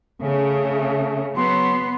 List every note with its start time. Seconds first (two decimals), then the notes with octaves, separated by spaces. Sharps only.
0.22 C#3 A3
1.36 F#3 B3 C6